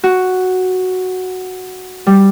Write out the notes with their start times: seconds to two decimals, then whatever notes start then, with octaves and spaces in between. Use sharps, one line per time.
0.04 F#4
2.07 G3